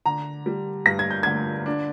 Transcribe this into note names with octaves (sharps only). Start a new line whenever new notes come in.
D3 A#5
G3
G2 A#6
G#6
G6
D3 G#6
D4